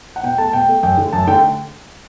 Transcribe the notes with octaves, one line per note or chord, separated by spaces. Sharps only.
F#5
B2 G5
A3 A5
B2 G5
A3
F#2 G5
D3 A3
F#2 A5
D3 A3 G5